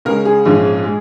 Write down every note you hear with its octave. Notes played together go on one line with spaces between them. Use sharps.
C#2 C#3 G#3 C#4 A#4
G#4
A#1 G#2 F3 C#4
G#3